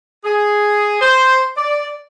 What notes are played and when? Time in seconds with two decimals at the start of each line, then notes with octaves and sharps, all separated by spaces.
0.25 G#4
1.00 C5
1.57 D5